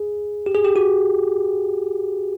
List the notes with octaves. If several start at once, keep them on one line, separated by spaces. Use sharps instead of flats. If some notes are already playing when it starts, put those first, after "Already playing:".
Already playing: G#4
G4
G#4
G4
F#4